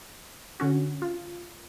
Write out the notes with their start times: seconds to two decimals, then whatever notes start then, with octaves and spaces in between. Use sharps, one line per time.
0.60 D3 C#4 F#4
1.02 F4